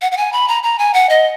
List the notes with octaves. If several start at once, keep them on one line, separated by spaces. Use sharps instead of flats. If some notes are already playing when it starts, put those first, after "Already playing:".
F#5
F#5
G#5
B5
A#5
A#5
G#5
F#5
D#5